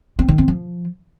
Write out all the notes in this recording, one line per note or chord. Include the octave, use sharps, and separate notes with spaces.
C4
D#3
C4
F3